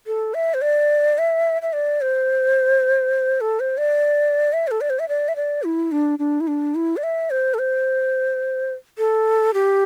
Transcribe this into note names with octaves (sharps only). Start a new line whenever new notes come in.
A4
E5
C5
D5
E5
E5
D5
C5
A4
C5
D5
E5
C5
A4
D5
C5
E5
D5
E5
D5
E4
D4
D4
E4
D4
E4
D5
E5
C5
A4
C5
A4
G4